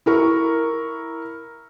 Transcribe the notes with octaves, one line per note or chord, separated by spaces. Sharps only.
E4 A#4 C#6